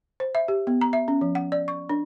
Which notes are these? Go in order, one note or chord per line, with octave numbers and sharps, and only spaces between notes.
C5
E5
G4
B3
A#5
E5
C#4
F3
F#5
D5
C#6
D4